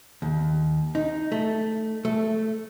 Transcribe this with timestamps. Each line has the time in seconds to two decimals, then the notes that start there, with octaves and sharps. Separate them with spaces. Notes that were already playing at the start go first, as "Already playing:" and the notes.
0.22 D#2
0.95 D#4
1.32 A3
2.05 A3